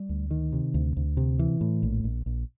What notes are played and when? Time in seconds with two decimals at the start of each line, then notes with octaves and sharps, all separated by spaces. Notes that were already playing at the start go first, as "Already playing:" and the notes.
Already playing: G3
0.09 D2
0.31 D#3
0.53 C3
0.74 D2
0.97 D2
1.17 C3
1.39 E3
1.61 A2
1.83 A#1
2.04 A#1
2.26 A#1